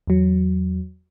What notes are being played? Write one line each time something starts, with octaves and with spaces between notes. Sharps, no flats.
E2 F#3